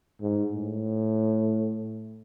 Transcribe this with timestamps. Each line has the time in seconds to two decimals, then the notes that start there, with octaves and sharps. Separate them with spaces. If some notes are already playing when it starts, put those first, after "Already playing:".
0.21 G#2
0.52 A2